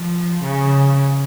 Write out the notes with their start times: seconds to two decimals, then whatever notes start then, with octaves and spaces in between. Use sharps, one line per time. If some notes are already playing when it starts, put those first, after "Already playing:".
Already playing: F3
0.43 C#3